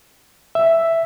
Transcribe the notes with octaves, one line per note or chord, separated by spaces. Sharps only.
E5